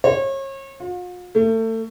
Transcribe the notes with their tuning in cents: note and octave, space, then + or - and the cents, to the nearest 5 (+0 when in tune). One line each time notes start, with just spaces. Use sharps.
C#5 -35
F4 +45
A3 +30